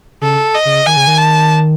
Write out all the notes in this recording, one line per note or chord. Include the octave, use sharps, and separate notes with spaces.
C#3 A4
D#5
C#3
D#3 G#5
C#3
D#3
A5